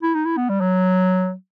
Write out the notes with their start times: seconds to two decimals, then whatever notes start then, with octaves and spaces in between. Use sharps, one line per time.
0.03 E4
0.15 D#4
0.25 E4
0.37 B3
0.49 G3
0.61 F#3